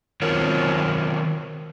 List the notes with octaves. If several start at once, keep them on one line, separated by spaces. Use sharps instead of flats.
D#3 F#3 C4 F4 A#4 C#5